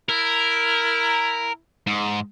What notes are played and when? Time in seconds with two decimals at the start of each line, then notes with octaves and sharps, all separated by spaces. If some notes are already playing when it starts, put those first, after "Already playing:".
0.09 E4 A#4
1.87 G#2